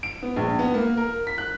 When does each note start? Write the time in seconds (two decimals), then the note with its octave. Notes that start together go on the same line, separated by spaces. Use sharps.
0.03 D7
0.23 B3
0.36 A#1
0.59 B3
0.74 A#3
0.97 A#4
1.27 B6
1.38 F#6